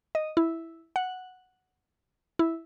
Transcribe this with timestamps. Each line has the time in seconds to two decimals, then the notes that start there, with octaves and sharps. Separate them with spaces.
0.15 D#5
0.37 E4
0.96 F#5
2.39 E4